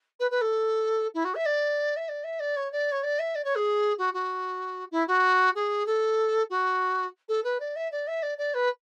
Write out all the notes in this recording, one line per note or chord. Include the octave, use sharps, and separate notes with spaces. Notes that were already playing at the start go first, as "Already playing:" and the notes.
B4
B4
A4
E4
F#4
E5
D5
E5
D5
E5
D5
C#5
D5
C#5
D5
E5
D5
C#5
G#4
F#4
F#4
E4
F#4
G#4
A4
F#4
A4
B4
D5
E5
D5
E5
D5
D5
B4